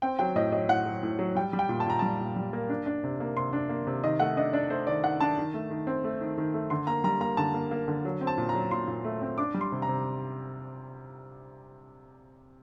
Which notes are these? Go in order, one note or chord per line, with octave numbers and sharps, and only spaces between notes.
C4 G5
F#3 G5
A2 D#5
F#3 D#5
A2 F#5
F#3
A2
F#3
G3 G5
G3
G5
A#2
A5
A#2 A#5
G3 A5
A#2
G3
A#3
D4
D4
C3
A#3
C3 C6
D4
A#3
C3
D#3 D#5
A3 F#5
D4 D#5
D4 D5
A3 C5
D#3 D5
D#3 F#5
D4 A5
D#3
A3
D#3
C4
A3
D#3
D#3
A3
D3 C6
A#3 A#5
G3 A#5
A#3 A#5
D3 A5
A#3
A#3
D3
F#3
C4
A5
A#2
A#5
F#3
A#2 C6
A#2
A3
C4
D4 D6
G3
C6
C3
A#5
C3